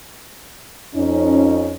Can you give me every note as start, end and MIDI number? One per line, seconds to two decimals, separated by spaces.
0.95 1.75 41
0.95 1.75 61
0.95 1.75 63